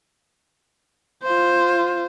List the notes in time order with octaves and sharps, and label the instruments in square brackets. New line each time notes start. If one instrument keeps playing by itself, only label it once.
[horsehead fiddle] F4 C5